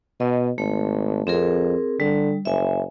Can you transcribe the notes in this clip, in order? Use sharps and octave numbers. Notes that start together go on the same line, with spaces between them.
B2 D#5
G#1 A3
F2 C4 G#4 A#4
D3 G3
F#1 E5 G#5